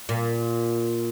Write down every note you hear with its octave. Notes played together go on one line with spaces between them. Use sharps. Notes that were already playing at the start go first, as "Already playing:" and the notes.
A#2